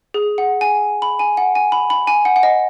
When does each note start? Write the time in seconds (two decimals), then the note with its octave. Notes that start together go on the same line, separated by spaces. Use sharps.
0.14 G#4
0.38 F#5
0.61 G#5
1.02 B5
1.19 G#5
1.37 F#5
1.55 G#5
1.72 B5
1.90 B5
2.07 G#5
2.25 F#5
2.36 F#5
2.43 D#5